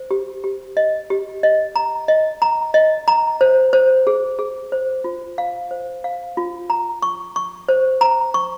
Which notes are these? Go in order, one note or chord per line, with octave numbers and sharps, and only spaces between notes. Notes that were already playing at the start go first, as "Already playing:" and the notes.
Already playing: C5
G4
G4
D#5
G4
D#5
A#5
D#5
A#5
D#5
A#5
C5
C5
G#4
G#4
C5
F4
F5
C5
F5
F4
A#5
C#6
C#6
C5
A#5
C#6